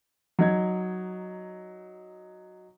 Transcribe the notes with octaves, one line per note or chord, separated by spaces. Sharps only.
F#3 D#4 G#6